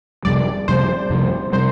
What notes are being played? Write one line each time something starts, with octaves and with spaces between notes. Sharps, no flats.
F2 C3 G3 D5
F2 C3 G3 C5
F2 C3 G3
C3 G3 C5